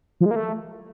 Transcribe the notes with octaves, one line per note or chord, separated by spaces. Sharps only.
F3
G#3
A#3
A3